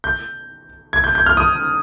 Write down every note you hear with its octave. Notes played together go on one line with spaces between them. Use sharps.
G6
G#6
G6
G6
F6
D#6